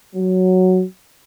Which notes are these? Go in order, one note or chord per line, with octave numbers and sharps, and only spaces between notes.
F#3